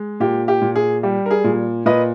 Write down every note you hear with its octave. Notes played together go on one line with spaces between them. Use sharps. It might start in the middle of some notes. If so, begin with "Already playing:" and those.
Already playing: G#3
A#2 G4
G4
A#2
G#4
G3 G4
A#4
G#4
A#2
A#2 B4 D#5